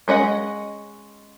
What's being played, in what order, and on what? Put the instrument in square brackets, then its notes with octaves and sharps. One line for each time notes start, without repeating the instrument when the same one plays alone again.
[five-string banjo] G#3 C#4 D#5 F#5